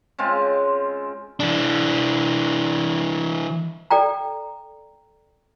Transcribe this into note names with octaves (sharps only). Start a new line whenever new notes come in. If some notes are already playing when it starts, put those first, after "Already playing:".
C#3 G#3 C4 F4
E3 D4
A4 D5 G5 A#5